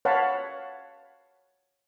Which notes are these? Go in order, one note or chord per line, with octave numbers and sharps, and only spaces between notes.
C#5 F5 F#5 A5 B5